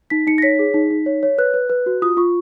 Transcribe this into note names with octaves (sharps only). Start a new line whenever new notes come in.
D#4 B6
D#4 C#7
A#6
C#5 B6
G#4
D#4
D#4
C#5
C#5
B4 F#6
B4
B4
F#4
F4 D#6
F4 C#6